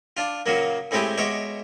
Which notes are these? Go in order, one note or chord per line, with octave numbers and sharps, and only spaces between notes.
D4 F4
A#2 C#3 F#3 A#3
A2 G#3 C4 E4 G4 G#4
B2 G#3 C#5 E5 D6